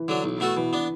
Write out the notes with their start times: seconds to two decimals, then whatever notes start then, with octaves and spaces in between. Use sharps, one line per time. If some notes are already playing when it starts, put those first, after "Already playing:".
Already playing: E3
0.08 D3 F#3 D4
0.24 B1
0.40 B2 A3 F#4 A4
0.57 B2 E3
0.73 B3 D4